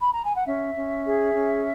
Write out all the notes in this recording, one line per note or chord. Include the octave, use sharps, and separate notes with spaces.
B5
A#5
G#5
F#5
C#4 E5
C#4
G#4
C#4